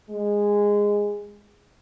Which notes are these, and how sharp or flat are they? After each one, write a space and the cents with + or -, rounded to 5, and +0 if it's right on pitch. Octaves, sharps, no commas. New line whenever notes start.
G#3 -15